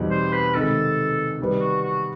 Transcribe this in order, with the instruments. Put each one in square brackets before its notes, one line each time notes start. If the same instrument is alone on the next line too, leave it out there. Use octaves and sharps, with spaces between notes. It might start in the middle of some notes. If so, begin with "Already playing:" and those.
Already playing: [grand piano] E2 B2 G3 C4 D#4
[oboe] C5
B4
[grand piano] C3 D#3 G#3 [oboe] A4
[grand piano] C3 D#3 G3 B3
[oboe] F#4
F#4